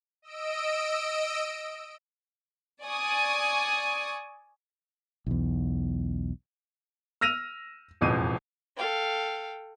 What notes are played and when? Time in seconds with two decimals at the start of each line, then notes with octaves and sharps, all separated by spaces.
0.22 D#5 E6 D7
2.84 D5 G#5 C#6 D#6
5.26 B1 E2
7.21 E6 F6 A#6 D#7 F7
8.01 E1 A1 F2 D#7
8.77 A4 F5 G5